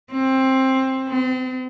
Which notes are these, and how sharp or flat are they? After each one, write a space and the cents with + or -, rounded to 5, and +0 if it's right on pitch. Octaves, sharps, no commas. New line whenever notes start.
C4 +15
C4 -40